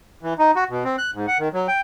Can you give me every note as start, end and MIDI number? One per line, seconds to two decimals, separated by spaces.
0.23 0.34 52
0.39 0.51 63
0.56 0.64 66
0.70 0.84 47
0.84 0.96 60
0.98 1.11 90
1.14 1.26 44
1.27 1.38 78
1.39 1.48 51
1.53 1.67 54
1.68 1.81 79